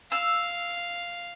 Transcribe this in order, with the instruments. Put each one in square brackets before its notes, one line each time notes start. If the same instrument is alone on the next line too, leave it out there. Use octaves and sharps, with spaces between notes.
[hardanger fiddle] F5 [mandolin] E6